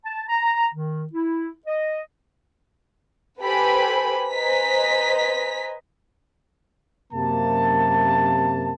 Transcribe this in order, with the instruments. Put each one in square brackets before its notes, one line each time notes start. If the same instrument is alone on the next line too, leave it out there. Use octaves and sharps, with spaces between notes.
[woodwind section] A5
A#5
D#3
E4
D#5
[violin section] G4 A4 B4 C5 G#5 B5
B4 C5 D#5 G#5 A#5 B6
[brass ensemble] F#2 C3 A#3 A5